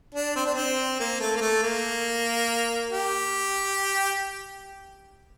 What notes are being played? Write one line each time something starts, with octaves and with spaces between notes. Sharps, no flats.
D4
C4
D4
C4
A#3
A3
A#3
A3
A#3
G4